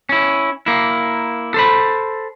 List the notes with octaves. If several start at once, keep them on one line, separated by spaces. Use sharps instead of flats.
C#4 E4
A#3 E4
A4 C5 B5